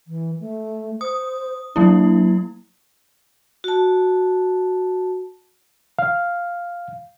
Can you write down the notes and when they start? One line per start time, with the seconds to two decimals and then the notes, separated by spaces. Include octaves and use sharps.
0.07 E3
0.40 A3
1.01 C5 D#6
1.76 F#3 A#3 D4 E4
3.64 F#4 A5
5.99 F5